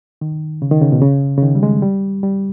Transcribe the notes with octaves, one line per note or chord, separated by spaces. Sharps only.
D#3
C#3
D#3
C#3
B2
C#3
C#3
D#3
G3
G#3
G3
G3